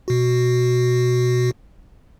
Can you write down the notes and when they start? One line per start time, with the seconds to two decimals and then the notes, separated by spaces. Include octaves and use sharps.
0.08 B2 F#4